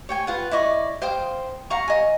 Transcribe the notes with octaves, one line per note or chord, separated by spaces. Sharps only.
C#5 G5 G#5
F4 B4 F#5
E4 D5 D#5 C#6
C5 F5 G5 D#6
F5 F#5 A#5 C#6
D#5 G#5